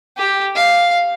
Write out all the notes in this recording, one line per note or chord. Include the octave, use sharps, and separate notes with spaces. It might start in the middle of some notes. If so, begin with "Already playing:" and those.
G4
F5